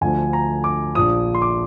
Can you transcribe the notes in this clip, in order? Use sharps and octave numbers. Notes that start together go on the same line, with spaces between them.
D2 D3 F3 G#5
A#5
D6
A#1 A#2 F3 D#6
C6
D6